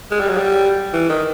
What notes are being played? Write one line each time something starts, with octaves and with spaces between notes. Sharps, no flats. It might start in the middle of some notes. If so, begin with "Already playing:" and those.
G#3
G3
F#3
G3
E3
D#3